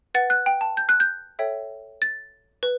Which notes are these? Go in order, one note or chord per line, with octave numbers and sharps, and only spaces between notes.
B4 F#5 A6
F#6
G5
A5
G6
F#6
G6
A4 C#5 E5 G5
A6
B4